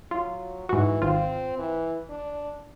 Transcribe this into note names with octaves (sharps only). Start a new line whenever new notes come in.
F#3 F4
G#2 E3 F#4
G#1 C4 F4
E3
D4